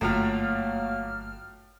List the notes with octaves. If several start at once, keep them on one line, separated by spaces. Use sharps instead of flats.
G1 F#2 A2 F#3 A3 A#3 F4 F6